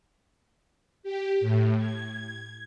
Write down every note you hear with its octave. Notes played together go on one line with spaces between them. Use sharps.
G4
A2
G#6